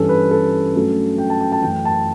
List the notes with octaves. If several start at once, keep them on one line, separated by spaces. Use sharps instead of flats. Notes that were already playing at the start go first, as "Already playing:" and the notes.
Already playing: G2 E3 G3 C#4 A4
B4
A4
G2 F#3 A3 C#4
G5
A5
G5
A5
F#2 E3 A3 C#4 G5
A5